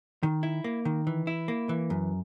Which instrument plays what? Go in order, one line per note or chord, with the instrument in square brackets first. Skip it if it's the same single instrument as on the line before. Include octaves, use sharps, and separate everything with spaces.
[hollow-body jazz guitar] D#3
E4
A#3
D#3
E3
E4
A#3
E3
F#2